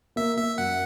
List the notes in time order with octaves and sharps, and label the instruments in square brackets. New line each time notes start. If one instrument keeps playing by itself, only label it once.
[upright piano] A#3 [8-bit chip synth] E5
[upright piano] A#3 [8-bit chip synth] E5
[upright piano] F#2 [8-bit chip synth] F#5